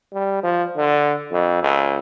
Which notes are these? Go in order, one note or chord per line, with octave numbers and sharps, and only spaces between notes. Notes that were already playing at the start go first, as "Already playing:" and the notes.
G3
F3
D3
F2
C#2